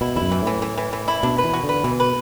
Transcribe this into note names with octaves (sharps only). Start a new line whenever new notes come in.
B2 E4
E2 E4
F#2
E3
A2 E3
E3
E3
E3
E4
B2 D4
B4
E3
F#4
D3
B4
B2 E3
B4